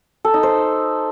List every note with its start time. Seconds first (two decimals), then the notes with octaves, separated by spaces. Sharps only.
0.25 A4
0.34 D#4
0.43 C5